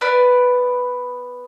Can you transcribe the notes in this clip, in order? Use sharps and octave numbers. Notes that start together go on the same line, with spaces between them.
B3 B4 D5